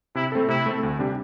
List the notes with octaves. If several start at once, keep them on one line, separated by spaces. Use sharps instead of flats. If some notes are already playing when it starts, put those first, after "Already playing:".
C3 E4
A3 C4 A4
C3 E4
A3 C4 A4
D2
C3 G3 D4 G4